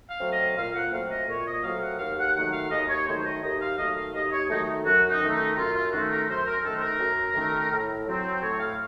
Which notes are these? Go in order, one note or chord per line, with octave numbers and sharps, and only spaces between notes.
F5
F#3 A3 C4
D#5
A#2 F5
F#5
F#3 A3 C4 F5
D#5
A#2 C#5
D#5
F#3 A3 C4 F5
F#5
D#2 F5
F#5
D#3 F#3 A3 F#5
F5
D#2 D#5
C#5
D#3 F#3 A3 C5
D#5
D#2 D#5
F5
D#3 F#3 A3 D#5
F5
D#2 D#5
D#5
C#5
D#3 F#3 A3 D#4
F#2 F#4
D#4
D#3 A3
D#4
F#2 F4
F4
D#3 A3 F#4
A#4
F#2 C5
A#4
D#3 A3 A4
C5
A#4
F#2
D#3 A3
A2
F#3 C4
A2 C#5
F5